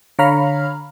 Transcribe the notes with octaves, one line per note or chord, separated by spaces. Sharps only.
D3 C#5 F5 A#5 B5 F6